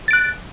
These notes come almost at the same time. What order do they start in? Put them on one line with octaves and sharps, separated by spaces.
A6 D7 F#6